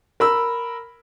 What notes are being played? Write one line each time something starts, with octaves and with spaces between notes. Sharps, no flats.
A#4 B5 E6